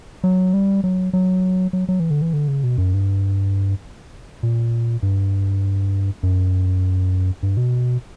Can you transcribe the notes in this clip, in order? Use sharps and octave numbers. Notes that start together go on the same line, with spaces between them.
F#3
G3
F#3
F#3
F#3
F#3
E3
D3
E3
D3
C#3
B2
F#2
G2
A#2
G2
F#2
G2
B2